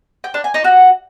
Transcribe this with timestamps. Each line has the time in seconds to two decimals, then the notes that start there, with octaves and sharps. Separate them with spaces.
0.24 G5
0.34 D4
0.44 G#5
0.54 D#4
0.64 F#4